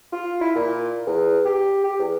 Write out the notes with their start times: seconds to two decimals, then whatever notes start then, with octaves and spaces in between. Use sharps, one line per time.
0.13 F4
0.41 E4
0.56 A#2
1.07 E2
1.45 G4
1.84 G4
1.99 E2